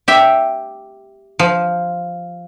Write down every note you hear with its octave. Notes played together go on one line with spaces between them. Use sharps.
G4 E5 G5
F3